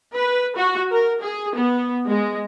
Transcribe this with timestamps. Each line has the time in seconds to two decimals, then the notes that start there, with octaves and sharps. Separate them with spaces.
0.15 B4
0.55 F#4
0.90 A#4
1.20 G#4
1.55 B3
2.07 G#3